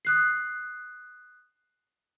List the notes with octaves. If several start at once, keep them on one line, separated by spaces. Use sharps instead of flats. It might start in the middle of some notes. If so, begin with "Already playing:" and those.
D#6 F#6 C7